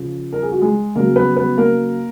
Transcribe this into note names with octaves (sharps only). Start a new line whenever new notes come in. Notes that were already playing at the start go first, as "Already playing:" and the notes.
Already playing: C#3 F3
A#4
G#4
F#4
G#3 G#4
C#3 F#3 A#3 A#4
B3 B4
B3 B4
A#3 A#4